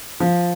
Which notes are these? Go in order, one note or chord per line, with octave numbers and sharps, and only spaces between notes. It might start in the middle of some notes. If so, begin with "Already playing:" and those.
F3